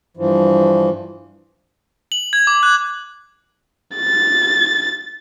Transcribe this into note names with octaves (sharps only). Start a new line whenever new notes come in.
G2 E3 F3
F#7
G#6
D6
F#6
A6